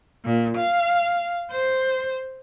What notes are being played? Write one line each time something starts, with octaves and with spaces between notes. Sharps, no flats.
A#2
F5
C5